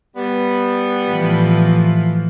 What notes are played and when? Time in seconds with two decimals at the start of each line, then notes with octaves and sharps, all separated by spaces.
0.16 G3 B3
1.07 A2 E3 F3